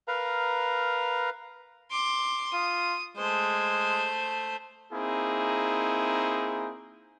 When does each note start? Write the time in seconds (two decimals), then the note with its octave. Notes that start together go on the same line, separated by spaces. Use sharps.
0.08 A#4 B4 F5 A#5
1.91 C6 D6
2.53 F4 D#6
3.17 G#3 A3 C5
4.93 A#3 C4 D#4 E4 G#4